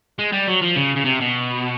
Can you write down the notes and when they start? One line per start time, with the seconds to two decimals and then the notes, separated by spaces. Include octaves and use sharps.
0.19 G#3
0.32 G3
0.48 F#3
0.62 F3
0.76 C#3
0.96 C#3
1.05 C3
1.21 B2